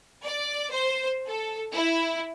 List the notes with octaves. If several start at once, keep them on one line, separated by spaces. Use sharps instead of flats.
D5
C5
A4
E4